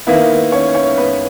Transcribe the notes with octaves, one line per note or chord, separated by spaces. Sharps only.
D#3 A#3 B3 E4 B4
C#4 C#5
C#4 C#5
B3 B4